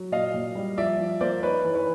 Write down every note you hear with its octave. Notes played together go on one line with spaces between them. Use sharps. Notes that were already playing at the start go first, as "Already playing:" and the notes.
Already playing: F#3
A#2 D#5 F5
A#2
G3
F3 D5 E5
F3
A#3 C5 D5
D#4 B4 C#5
E3
B4 C#5